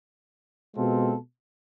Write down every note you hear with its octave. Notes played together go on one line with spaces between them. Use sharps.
B2 G#3 C4 F4 A4